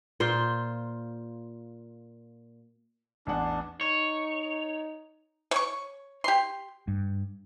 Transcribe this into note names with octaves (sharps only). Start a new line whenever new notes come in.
A#2 F4 C5
A1 E2 D4 F#5
D#4 C#5
C#5 C#6
G4 C6
G2